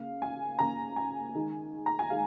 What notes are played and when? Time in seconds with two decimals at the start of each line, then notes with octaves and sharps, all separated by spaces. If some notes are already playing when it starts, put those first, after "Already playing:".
Already playing: C#3 A#3 F5
0.22 G#5
0.59 C#3 A#3 A#5
0.96 G#5
1.35 D#3 G#3
1.86 A#5
1.99 G#5
2.10 D#3 G#3 F5